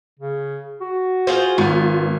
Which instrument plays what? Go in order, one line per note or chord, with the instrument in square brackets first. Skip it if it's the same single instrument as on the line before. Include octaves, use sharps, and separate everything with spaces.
[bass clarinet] C#3
F#4
[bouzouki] F4 G#4 C5
[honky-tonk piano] G#1 [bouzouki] B3 [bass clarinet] F4